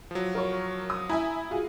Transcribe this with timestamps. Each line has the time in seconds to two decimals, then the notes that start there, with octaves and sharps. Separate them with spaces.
0.11 F3 F#3
0.35 A#4 C#5
0.90 D#6
1.09 E4 E5 G#5 A#5
1.51 F4 F#4 G#4